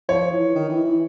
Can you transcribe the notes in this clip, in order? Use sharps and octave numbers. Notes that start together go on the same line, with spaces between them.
F3 C#5
E3
D#3
E3
E3